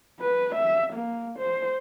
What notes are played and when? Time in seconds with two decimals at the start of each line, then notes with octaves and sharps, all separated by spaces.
0.20 B4
0.55 E5
0.93 A#3
1.39 C5